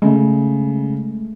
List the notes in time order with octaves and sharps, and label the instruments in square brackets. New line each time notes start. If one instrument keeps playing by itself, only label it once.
[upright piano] C#3 [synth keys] G#3 A3